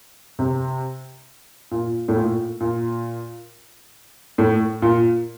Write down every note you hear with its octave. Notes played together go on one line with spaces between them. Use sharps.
C3
A#2
A2
A#2
A#2
A2
A#2